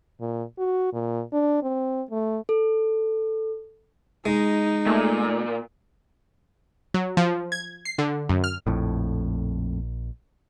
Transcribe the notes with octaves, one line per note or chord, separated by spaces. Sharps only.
A#2
F#4
A#2
D4
C4
A3
A4
G#3 D#4
A#2 A3
F#3
F3
G#6
C7
D3
F#2
F6
A#1 F2 A2